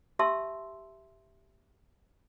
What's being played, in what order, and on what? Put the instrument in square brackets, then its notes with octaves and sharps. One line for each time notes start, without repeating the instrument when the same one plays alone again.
[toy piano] G4 E5 A5 C6 E6